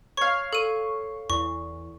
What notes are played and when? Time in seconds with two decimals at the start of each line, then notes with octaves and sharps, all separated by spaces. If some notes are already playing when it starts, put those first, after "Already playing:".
0.17 C#5 F5 C#6
0.53 A4 C#6 D#7
1.30 E2 C#6